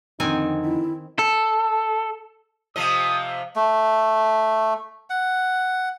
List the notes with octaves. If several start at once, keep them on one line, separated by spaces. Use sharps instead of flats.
F2 D3 D#3 C4 D#4 G#5
E4
A4
C3 F3 D#5 D#6
A3
F#5